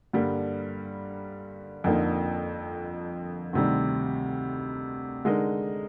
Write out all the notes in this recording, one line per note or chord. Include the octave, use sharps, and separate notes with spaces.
G2 D3 G3 A#3
F2 D3 F3 A#3 D#4
D2 C3 D#3 G3
D3 G#3 D#4 A#4 D#5